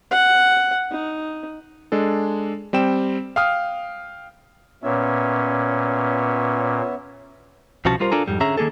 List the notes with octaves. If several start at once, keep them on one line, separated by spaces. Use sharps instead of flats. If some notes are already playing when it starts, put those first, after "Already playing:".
F#5
D#4
G#3 D4 A4
G3 C4 G5 E7
F5 G5 D#6 F6
A#2 B3 C#4 C#5 E5
C2 B2 F3 C#4 F#4 A5
G3 F4 A#4 C5
D4 F4 A4 A#4 G#5 A#5
F2 G#2 G3
D3 C#4 G#4 E5 A#5
D#3 A#3 G#4 A4